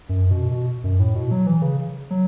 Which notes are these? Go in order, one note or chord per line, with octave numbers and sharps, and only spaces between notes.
F#2
B2
B2
F#2
A2
B2
F#3
E3
C#3
F#3